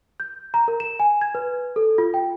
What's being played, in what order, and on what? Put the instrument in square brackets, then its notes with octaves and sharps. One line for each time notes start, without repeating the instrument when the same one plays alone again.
[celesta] G6
A#5
A#4
E7
G#5
G#6
B4
A4
F4
G5